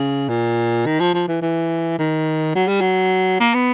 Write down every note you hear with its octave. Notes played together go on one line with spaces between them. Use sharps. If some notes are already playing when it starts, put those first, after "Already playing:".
Already playing: C#3
A#2
D#3
F3
F3
E3
E3
D#3
F#3
G3
F#3
A#3
B3